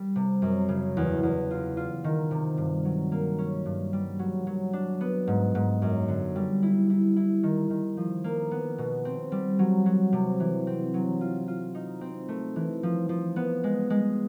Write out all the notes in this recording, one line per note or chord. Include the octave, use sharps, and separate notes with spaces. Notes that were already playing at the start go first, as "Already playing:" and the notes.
Already playing: G3
C3
F#2
C#3
E2
E2
F4
F4
D#3
C3
G2
F#3
A#3
C#4
G2
G3
F#3
F#3
D4
B3
G#2
G#2
F#2
D3
G3
E4
E4
E4
D#3
D#3
F3
A#3
B3
B2
C4
G3
F#3
F#3
C3
E3
C4
F#3
F4
F4
D#4
C4
A3
E3
F3
F3
B3
G#3
G#3